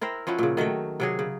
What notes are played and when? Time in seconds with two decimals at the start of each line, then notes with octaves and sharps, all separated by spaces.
0.01 E4 A#4 C5 G5
0.27 F3 C#4 E4 F#4
0.38 A#2 C#3
0.57 D#3 F#3 A3 G5
1.00 C3 F#3 G#4
1.19 C#3